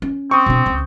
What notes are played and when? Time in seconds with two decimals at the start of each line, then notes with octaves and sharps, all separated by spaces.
0.02 C#4
0.31 C4 C#6 D#6
0.46 B2 D4
0.66 C#2